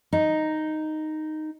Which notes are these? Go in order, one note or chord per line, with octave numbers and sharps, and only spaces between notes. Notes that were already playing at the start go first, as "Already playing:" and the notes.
D#4